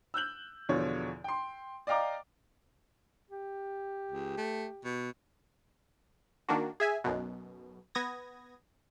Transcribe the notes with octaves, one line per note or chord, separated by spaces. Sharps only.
E6 F#6 G6 F#7
E2 B2 D3 F3 C#5
G5 C6
D5 D#5 F5 G5 A#5 D6
G4
C#2
A3
B2
D#3 A#3 D4 F#4
G#4 E5 G#5
B1 F#2 B2
B3 D#6 G#6 A#6